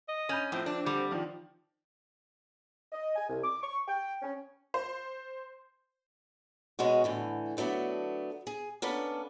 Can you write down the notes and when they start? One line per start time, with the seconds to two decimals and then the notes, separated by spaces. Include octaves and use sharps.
0.08 D#5
0.29 C#4 B5 G6 D#7
0.52 A2 F3 C4
0.66 D4
0.86 D3 G3
1.11 D#3 F3 D4
2.92 D#5
3.16 G#5
3.29 C2
3.43 D6
3.62 C#6
3.88 G5
4.22 C#4
4.74 C5
6.79 B2 G#3 C#4 F#4
7.04 A2 D3 E3
7.57 D3 F#3 A3 B3 D4
8.47 G#4
8.82 A#3 B3 C#4 D4 A4 B4